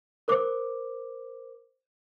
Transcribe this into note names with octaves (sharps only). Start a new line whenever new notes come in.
A#4 C5 D6